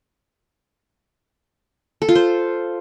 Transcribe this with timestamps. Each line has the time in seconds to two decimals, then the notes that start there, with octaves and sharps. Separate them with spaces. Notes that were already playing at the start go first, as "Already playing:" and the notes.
2.02 A4
2.09 F4
2.15 C5